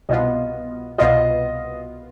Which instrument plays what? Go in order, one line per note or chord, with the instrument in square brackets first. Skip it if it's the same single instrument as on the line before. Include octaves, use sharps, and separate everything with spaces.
[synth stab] C2 B2 B3 F4 [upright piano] D#5
[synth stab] C2 B2 B3 F4 [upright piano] D#5